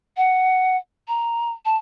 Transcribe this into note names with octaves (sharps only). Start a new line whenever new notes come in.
F#5
A#5
A5